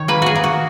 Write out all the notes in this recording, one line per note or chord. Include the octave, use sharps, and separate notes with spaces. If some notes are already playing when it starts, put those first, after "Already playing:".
Already playing: D#3 C#5
A#3 B4
F#4 G#4
A#3
F#4